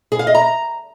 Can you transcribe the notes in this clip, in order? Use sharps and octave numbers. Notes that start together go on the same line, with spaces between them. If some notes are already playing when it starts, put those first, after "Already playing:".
G#4
F5
D#5
A#5